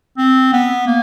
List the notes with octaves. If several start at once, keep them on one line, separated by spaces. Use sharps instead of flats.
C4
B3
A#3